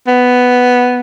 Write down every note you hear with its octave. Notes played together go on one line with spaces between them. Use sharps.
B3